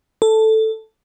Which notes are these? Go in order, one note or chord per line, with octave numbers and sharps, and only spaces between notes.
A4